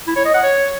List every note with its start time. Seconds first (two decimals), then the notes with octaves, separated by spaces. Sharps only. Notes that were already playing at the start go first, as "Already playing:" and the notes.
0.07 E4
0.16 C#5
0.25 D#5
0.34 F#5
0.43 C#5